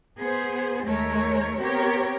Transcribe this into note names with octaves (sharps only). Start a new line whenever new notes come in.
B3 G#4 C5
D#2 G#3 A3 A#4 C#5
B3 C4 G4 A#4 C#5